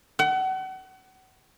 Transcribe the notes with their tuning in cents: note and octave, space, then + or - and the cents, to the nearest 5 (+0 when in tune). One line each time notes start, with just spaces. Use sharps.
F#5 +35